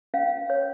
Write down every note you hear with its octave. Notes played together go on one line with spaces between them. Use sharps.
C#4 F5
C#5